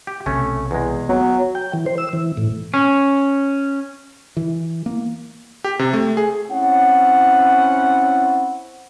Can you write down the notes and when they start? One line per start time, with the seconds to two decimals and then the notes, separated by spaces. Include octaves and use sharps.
0.07 G4
0.26 B1 C3 A3 C#4
0.71 E2 G#3
1.09 F#3 B3
1.55 G5
1.74 E3
1.86 C5
1.98 E6
2.13 E3
2.37 A2
2.74 C#4
4.37 E3
4.86 A#3
5.64 G4
5.79 C3
5.93 A3
6.17 G#4
6.50 C4 C#4 E4 F#5